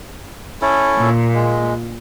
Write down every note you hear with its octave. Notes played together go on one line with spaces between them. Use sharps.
C#4 E4 A4
A#2
G#3